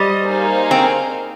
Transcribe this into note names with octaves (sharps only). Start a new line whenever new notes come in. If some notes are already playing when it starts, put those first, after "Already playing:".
Already playing: G3 C5 D#5
A#3 D#4 G#4 C5 F5
C4